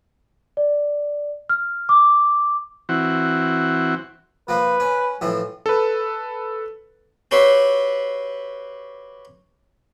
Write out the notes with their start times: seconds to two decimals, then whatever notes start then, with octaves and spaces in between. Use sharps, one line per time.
0.57 D5
1.49 F6
1.89 D6
2.89 E3 C4 F#4
4.49 F3 A#3 B4
4.80 C#4
5.21 A2 E3 F3
5.66 A4 B4
7.31 F#4 G4 B4 C#5 E5 C6